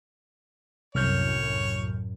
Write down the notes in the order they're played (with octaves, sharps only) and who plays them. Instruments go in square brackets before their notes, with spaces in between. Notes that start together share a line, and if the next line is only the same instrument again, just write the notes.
[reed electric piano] C2 F6 G6 [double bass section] F#2 A2 [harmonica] C#5